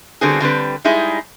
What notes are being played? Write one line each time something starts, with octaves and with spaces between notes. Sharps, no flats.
D3 G3 B3 C4 F#4 G#4
D3 G3 C4 B4
G3 G#3 D#4 E4 G#4